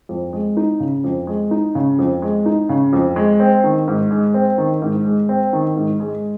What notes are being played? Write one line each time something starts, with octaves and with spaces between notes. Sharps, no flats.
F2
G#3
D#4
C#3
F2
G#3
D#4
C#3
F2
G#3
D#4
C#3
F2
G#3
C4
D#3
G#2
G#3
C4
D#3
G#2
G#3
C4
D#3
G#2
G#3